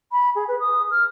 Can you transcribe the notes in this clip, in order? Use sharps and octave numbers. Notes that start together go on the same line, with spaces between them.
B5
G#4
B4
D#6
F6